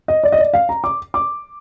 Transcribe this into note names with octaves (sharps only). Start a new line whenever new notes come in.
D#5
D5
D#5
D5
F5
A#5
D6
D6